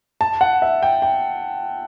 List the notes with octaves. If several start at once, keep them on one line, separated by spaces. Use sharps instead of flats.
A5
F#5
E5
G5
G5